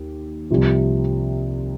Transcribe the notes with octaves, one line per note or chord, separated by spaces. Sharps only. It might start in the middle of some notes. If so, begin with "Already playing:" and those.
Already playing: D#2
C2 C3 F3